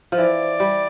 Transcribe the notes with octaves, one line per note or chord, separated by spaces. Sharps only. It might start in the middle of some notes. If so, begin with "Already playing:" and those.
F3
E3 D5
G3